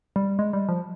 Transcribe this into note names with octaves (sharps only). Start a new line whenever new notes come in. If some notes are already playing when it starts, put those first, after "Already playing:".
G3
G#3
G3
F3